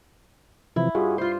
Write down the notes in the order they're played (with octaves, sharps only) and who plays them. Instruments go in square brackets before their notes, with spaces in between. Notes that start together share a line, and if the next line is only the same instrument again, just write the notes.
[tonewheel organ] C3 E3 F3 [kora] E4
[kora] G2 [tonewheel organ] F4 F#4 G#4
[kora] F4 C5 [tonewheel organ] C6